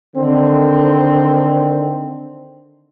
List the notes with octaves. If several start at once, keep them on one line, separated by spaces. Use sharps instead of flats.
D3 D#3 C4